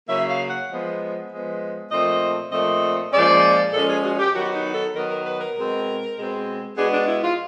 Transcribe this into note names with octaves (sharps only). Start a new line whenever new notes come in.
C#3 F#3 A#3 E5
F5
F#5
F3 G#3 B3
F3 G#3 B3
A#2 F3 A3 C4 D#5
A#2 F3 A3 C4 D#5
A#2 F3 G#3 C#4 D5
A#2 F3 G#3 C#4 A4
G#4
F#4
G4
D#3 F#3 B3 F#4
D#4
A4
D#3 F#3 B3 A#4
A#4
B4
A#4
B2 G#3 C4
B2 G#3 C4
B2 G#3 B3 D4 G#4
D4
E4
F4